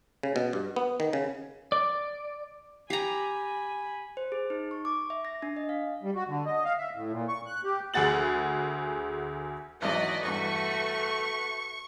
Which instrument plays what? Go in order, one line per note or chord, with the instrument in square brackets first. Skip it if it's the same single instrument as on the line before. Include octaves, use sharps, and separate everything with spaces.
[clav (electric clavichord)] C#3
B2
G2
B3
D#3
C#3
[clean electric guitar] D5
[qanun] G4 A#5 [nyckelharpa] G#5 B5
[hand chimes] C5
G#4
D#4
C#6
D6
E5
A#6
D4
D#5
F5
[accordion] G3
F#4
D3
D#5
F5
E5
A2
A#2
C#6
F#6
G4
[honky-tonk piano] D2 G#4 F#5 A6 F#7
[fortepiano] G#1 E2 F#3 [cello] F#4 B4 [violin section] D5 D#5
[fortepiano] E2 G2 [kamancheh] A3 [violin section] C#6